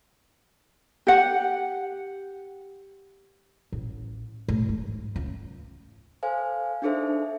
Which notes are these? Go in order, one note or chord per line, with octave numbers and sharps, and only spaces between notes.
G4 F#5
A1
A2
G#2
C#2
A4 C5 F5 G#5
D4 D#4 G#4 A4 C5 E5